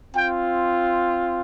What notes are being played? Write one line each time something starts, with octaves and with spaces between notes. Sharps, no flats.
C4 F4 G5